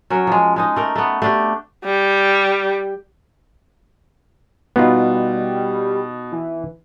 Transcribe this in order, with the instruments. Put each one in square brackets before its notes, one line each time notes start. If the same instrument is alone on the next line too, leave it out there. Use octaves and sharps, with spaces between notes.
[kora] F#3 C#4 A#4
F3 G#3
G#3 D#4 D#5
A3 A#4
A3 B3
A3 D4 G4
[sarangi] G3
[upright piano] B2 [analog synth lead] G3 [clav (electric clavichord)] B3 D#4 F4
[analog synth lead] E3